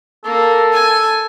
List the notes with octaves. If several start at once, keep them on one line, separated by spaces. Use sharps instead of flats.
A#3 A4
G#5